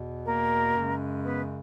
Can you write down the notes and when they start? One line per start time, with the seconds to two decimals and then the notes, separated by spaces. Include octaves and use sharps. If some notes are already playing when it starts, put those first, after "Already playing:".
Already playing: E2 B2
0.26 A#3 A#4
0.75 F#2 C#3 G#3 C#4
1.24 B3 B4